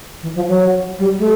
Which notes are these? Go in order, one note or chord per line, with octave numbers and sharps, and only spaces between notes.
E3
F3
F#3
G3
A3